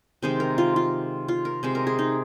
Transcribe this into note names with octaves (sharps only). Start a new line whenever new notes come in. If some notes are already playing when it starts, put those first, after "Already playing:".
C3 D#3 G#3 C5
A#4
F4
F4
F4
A#4
C3 G#3 C5
A#4
G#4
D#4